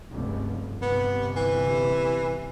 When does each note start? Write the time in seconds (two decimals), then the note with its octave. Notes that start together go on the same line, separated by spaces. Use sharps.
0.11 F1 C#2 G2
0.82 G1 C3 B3
1.36 E3